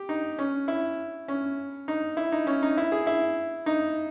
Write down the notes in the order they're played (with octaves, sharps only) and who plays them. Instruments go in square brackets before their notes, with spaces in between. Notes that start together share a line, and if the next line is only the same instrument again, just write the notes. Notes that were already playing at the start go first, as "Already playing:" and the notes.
Already playing: [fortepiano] G4
D#4
C#4
E4
C#4
D#4
E4
D#4
C#4
D#4
E4
G#4
E4
D#4